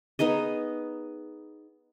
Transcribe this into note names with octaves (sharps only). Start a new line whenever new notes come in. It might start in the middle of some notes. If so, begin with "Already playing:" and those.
B3 D#4 G#4 D#5